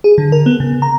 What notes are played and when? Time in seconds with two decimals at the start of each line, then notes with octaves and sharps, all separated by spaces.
0.04 G#4
0.18 D3
0.32 A#4
0.46 B3
0.60 C#3
0.82 A#5